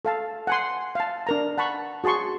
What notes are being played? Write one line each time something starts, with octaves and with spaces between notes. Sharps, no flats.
A4 F5 A5
F#5 G#5 C6
F5 A5
D4 A#4 A#5
F#5 A5 B5 C#6
F#4 G#4 A5 C6 C#6